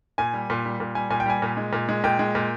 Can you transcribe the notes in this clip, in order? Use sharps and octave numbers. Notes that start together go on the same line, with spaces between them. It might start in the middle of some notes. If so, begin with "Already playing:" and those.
A#2 G#5
G3
A#2
G3
A#2
G3 G#5
A#2 G#5
G5
G3 G#5
A#2
G#3
A#2
G#3
A#2 G5
G#3
A#2